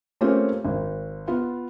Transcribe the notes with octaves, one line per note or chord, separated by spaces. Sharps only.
A3 A#3 C4 C#4 F4 G4
G#1
B3 F4